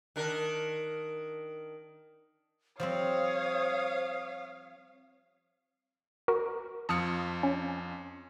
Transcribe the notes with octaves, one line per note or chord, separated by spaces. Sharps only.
D#3 D4 A#4
F3 G3 C4 C5 C#5 F5 D#6
F#4 A#4
F2 F3 A5 D#6 F6 C#7
C#4